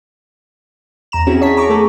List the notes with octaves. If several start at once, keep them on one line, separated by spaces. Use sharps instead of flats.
E2 A#5 E7
C4 C#4 E4 F#4 G#4
C#5 A5 B6
A#5 C#6 D6
A3 G#4 A4